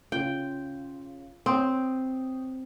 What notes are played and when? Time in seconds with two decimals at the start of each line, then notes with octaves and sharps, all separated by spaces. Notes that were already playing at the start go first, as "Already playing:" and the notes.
0.12 C#3 F4 G5
1.46 C4 C#5 G5 D#6